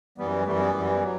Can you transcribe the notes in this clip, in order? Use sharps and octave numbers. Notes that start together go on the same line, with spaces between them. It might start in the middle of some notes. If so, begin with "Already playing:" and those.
F#2 E3 G3 B3
F#2 E3 G3 A3
B3
F#2 E3 G3
F#3